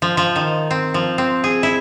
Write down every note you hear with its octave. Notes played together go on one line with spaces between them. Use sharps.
F3
F3
D#3
C4
F3
C4
G#4
E4